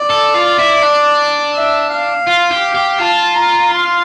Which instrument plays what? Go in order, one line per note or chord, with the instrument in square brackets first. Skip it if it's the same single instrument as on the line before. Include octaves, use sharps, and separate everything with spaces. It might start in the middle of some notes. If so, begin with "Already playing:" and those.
Already playing: [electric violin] D5
[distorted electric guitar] A4
F4
E4
D4
[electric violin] E5
F5
[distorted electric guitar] F4
G4
G4
[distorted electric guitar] F4 [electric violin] A5
[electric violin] A#5
C6